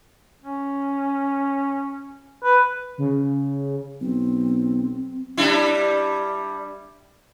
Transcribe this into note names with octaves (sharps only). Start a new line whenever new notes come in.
C#4
B4
C#3
B1 C4
G3 D4 E4